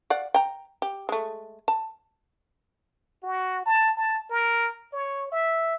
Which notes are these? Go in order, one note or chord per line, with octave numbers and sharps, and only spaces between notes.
D5 F5 F#5
G5 A#5
G4
G#3 A3
A5
F#4
A5
A5
A#4
C#5
E5